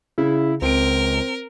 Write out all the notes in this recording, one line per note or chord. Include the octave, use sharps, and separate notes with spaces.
C#3 E4
C#2 C4 A#4 D7